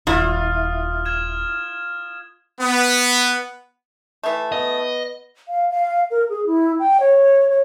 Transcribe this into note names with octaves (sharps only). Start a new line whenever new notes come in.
D#1 E4 F4 D#6 F6
F6 G#6 E7
B3
E3 A3
B3 D#5
F5
F5
A#4
G#4
E4
G5
C#5
C#5